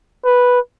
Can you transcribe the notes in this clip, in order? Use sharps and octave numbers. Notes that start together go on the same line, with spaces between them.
B4